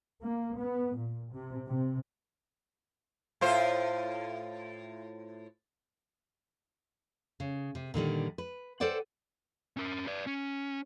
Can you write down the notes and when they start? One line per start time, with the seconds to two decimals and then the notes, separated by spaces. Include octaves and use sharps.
0.21 A#3
0.58 B3
0.96 A#2
1.32 C3
1.67 C3
3.41 A2 F4 C5
7.40 C#3
7.75 C3
7.94 A#2 D3 D#3 G3
8.38 B4
8.80 A4 B4 C5 D5 F#5 G5
9.77 C#4 A#4
10.07 B4 D5
10.27 C#4